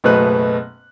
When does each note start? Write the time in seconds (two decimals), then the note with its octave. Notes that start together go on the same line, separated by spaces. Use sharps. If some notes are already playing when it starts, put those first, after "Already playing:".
0.04 F#1 B2 A3 B3 B4 F#6